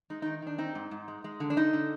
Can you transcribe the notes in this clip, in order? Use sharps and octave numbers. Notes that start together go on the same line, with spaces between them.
G#3 D#4
D#3 D#4
D#3 D4
C4 D#4
G#2
G#2
G#3
G#3
D3
D4
D3 D#4
D3